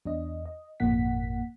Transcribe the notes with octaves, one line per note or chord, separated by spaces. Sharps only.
E2 D4 D#5
D#5
G#1 F2 A#2 A#3 F#5 B6